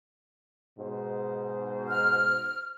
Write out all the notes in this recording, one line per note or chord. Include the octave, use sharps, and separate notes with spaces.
G#2 B2 C5
F6